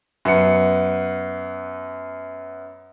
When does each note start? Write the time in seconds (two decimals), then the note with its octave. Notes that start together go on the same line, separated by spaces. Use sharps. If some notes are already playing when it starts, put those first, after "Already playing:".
0.25 F#2 B3 C#7